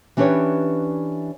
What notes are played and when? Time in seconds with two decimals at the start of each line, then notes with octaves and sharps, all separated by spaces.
0.17 E3 C#4 D4 G4 B4 C#5